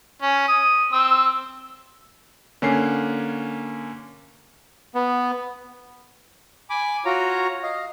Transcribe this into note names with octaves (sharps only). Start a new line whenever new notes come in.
C#4
D#6
C4 E6
D3 A#3 C#4 G#5 C7
B3
G#5 B5 D6
F4 F#4 C#5 A#5
D#5 F5